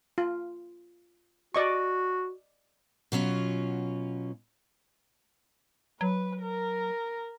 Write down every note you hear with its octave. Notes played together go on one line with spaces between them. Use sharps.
F4
F#4 D5 D#5 C#6
B2 F#3 C#4 F4
F#3 B4
A#4